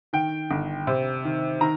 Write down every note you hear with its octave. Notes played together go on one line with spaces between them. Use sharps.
D#3 G5
G1
C3
D#3
D#3 A#5